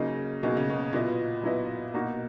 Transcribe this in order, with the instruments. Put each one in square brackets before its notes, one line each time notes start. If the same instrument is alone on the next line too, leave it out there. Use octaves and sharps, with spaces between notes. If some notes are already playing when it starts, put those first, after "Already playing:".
Already playing: [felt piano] C#3 [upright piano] F#3 A#3 D#4 G#4 D#5
[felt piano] B2 [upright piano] F#3 A#3 D#4 G#4 D#5
[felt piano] C#3
B2
[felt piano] A#2 [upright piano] F#3 B3 E4 B4 D#5
[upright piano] F#3 B3 E4 B4 D#5
[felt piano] B2 [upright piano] A#3 D#4 F#4